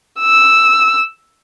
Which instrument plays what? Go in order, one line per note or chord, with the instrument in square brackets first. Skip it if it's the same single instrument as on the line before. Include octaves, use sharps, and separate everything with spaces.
[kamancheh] E6